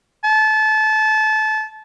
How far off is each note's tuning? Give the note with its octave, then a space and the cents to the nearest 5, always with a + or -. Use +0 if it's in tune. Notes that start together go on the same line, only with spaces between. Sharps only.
A5 -25